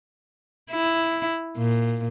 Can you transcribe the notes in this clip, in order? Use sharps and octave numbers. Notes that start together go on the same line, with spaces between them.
E4
A#2